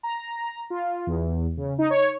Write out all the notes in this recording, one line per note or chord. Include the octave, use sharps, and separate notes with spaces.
A#5
F4
E2
C#3
D#4
C#5